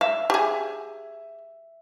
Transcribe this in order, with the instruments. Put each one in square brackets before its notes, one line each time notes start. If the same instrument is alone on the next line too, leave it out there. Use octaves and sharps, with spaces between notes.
[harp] E5 [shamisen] F5
[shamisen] G4 G#4